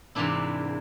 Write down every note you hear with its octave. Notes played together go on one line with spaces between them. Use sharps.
G#2 C3 E3 A#3 D4 E4